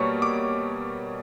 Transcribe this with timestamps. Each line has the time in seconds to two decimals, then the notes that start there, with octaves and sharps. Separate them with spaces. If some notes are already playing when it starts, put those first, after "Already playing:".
Already playing: B2 G3 A#3 C#5 C#6
0.22 D6